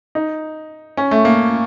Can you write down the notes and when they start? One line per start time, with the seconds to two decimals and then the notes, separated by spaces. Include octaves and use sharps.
0.15 D#4
0.97 C#4
1.11 A3
1.25 A#3